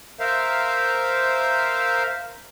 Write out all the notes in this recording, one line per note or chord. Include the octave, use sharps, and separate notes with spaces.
A#4 C5 E5 F5